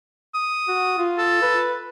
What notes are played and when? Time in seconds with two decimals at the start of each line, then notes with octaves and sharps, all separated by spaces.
0.35 D#6
0.68 F#4
0.98 F4
1.18 A4
1.42 B4